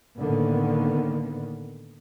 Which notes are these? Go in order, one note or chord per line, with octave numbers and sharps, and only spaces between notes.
A2 D3 D#3 A#3 B3